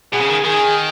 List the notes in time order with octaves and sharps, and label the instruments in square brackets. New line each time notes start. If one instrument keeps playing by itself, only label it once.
[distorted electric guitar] B2 [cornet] G#4
[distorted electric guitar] C#3
D#3
[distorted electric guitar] D#3 [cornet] G#4